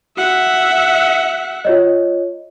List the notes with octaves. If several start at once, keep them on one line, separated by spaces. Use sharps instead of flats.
F#4 E5 F#5
F4 C#5 D#5